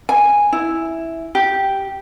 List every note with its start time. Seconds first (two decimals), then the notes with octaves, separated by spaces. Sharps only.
0.09 G#5
0.53 E4
1.35 G4